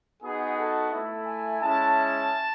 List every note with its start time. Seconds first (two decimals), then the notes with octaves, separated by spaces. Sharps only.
0.22 B3 D#4 F#4 G#4
0.57 A4
0.92 A3 E4
1.27 G#5
1.61 G#3 C#4 E4 A5